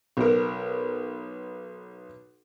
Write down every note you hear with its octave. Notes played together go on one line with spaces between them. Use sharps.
B1 A#4